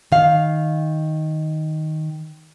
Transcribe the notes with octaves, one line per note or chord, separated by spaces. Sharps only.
D#3 F5